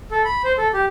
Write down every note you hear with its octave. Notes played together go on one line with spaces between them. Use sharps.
A4
B5
C5
A4
G4